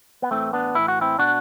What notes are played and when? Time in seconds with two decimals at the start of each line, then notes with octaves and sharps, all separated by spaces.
0.22 B3
0.31 A2 E3 A3 C4
0.53 B3 D4
0.75 A2 E3 E4
0.88 F#4
1.01 C4 E4
1.18 B2 D4 F#4